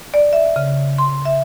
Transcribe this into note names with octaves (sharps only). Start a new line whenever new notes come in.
D5
E5
C#3
C6
E5